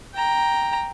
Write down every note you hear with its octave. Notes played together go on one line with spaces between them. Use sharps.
G5 A#5